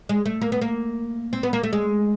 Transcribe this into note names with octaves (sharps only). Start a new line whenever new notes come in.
G#3
A3
A#3
B3
A#3
C4
B3
A#3
A3
G#3